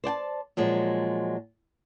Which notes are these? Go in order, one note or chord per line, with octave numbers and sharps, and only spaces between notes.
C5 D5 G5 A5
A#2 F3 F#3 G#3